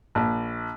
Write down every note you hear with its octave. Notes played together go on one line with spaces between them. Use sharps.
A#1